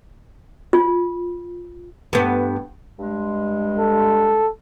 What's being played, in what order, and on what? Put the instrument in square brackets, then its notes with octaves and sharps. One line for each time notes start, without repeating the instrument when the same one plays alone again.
[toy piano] F4
[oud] G2 B3
[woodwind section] G2 G#3
[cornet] A4